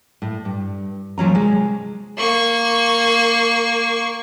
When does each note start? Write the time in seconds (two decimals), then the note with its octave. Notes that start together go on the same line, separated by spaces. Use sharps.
0.22 A2
0.45 G2
1.18 D#2 F3 F#3 C#4 A#5
1.33 C3 G#3
2.17 A#3 C#6